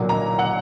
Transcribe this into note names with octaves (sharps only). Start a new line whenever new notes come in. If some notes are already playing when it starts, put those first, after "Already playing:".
Already playing: B1 A#2 F#3 A#3
A#5
F#5